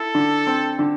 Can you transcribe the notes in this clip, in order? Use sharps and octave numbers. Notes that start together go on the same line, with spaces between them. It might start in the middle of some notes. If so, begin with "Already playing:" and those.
Already playing: E4 A4
D3
C4
D3